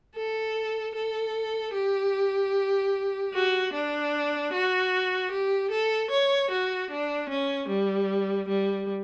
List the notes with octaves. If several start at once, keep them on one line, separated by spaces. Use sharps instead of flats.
A4
A4
G4
F#4
D4
F#4
G4
A4
C#5
F#4
D4
C#4
G3
G3